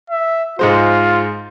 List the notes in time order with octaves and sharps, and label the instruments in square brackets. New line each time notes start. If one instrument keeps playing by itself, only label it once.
[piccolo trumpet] E5
[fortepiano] G#2 G#3 C5 [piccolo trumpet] F4